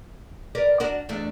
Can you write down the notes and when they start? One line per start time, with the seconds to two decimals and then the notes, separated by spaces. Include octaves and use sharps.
0.55 A#4 B4 D5
0.80 D4 F#4 A#4
1.09 E2 A3 D4